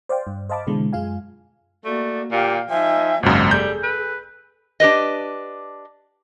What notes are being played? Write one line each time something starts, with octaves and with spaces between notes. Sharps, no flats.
C5 D5 F5 G5
G2
C5 D#5 F5 A5 B5 D6
B2 D3 E3 G#3
F#2 G#3 F4 F5 G#5
A3 A#3 F#4 D5
A#2 G4 F5 G5
F3 D#4 E5 G#5
G#1 C#2 F#2 F3 A#3 D#4 F#4
G3 G#4 A4 G6
B4
D4 G4 B4 D#5